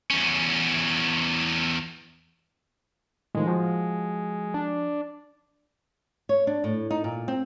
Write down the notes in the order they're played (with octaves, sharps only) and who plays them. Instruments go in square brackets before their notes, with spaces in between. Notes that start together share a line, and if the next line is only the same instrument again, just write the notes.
[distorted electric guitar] E2 C#4
[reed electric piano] A2 D#3 F3 [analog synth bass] G#3
[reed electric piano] F3 F#4
[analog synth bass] D4
[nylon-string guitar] C#5
D4
A2
D#4
A#2
C4